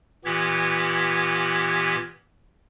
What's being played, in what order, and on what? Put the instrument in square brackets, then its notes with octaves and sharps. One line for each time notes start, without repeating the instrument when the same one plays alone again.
[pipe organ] A#2 E3 B3 G4 G#6